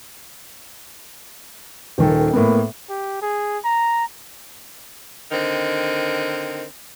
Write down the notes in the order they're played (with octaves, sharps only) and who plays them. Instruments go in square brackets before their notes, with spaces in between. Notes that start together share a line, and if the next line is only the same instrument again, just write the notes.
[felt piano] D#1 D#3 A4
A2 A#3 B3
[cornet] G4
G#4
A#5
[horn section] D3 D#3 C4